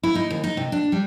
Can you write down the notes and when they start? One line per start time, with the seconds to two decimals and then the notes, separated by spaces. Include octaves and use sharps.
0.03 E4
0.15 D#4
0.30 D#2
0.44 D#4
0.57 C3
0.72 D4
0.92 G3